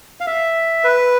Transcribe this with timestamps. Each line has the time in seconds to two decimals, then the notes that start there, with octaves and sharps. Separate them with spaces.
0.20 F5
0.27 E5
0.84 B4